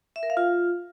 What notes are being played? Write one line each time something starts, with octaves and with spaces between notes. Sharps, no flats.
E5
A#4
F5
F4